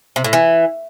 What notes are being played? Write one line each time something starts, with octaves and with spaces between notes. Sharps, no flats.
C3
A2
E3